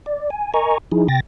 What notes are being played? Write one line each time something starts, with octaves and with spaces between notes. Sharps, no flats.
D5
G#5
A#4 D#5 G#5 A#5 C#6
F3 D#4 E4 G#4
C3 G5 A6 A#6